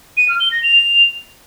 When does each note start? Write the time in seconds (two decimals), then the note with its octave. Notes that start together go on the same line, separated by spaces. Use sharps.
0.17 D#7
0.29 F6
0.40 G7
0.52 A#6
0.63 F7